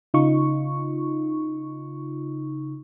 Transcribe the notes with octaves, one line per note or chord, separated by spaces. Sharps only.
C#3 D#4 F4 C#6